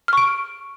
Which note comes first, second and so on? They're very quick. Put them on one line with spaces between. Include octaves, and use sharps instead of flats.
F6 C#6 D7